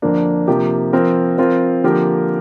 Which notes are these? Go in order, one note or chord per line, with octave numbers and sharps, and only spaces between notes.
F2 D3 A#3 D4
C3 F3 A#3 G4
F3 C4 A#4
F3 C4 F4 A#4
D3 F3 A#3 G4 A#4